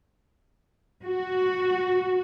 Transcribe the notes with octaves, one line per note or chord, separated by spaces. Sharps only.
F#4